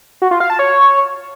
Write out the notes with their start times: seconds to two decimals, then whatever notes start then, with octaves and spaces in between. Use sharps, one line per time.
0.22 F#4
0.31 F4
0.40 F5
0.50 A5
0.59 C#5